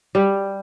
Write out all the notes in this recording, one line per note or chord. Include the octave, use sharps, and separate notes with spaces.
G3